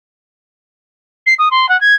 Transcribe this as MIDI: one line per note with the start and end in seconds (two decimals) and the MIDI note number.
1.26 1.34 96
1.39 1.49 87
1.51 1.69 84
1.69 1.79 78
1.81 1.95 92